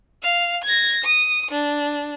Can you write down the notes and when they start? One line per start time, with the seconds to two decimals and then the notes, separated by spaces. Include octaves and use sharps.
0.23 F5
0.64 G#6 A#6
1.04 D#6
1.51 D4